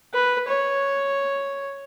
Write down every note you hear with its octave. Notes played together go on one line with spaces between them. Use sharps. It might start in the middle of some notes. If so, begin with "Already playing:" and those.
B4
C#5